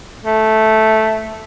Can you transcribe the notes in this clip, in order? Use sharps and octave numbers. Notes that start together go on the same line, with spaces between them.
A3